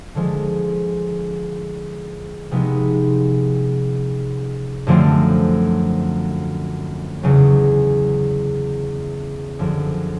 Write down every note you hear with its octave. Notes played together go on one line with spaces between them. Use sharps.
D3 F3 G#3
C3 F3 G#3 B3 D#4
F#2 D3 F3 A3 C4
E2 C#3 F#3
F#2 D3 F3